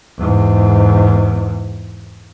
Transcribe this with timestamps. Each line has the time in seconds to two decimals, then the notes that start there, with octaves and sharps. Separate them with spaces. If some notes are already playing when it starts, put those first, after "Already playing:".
0.19 E2 G#2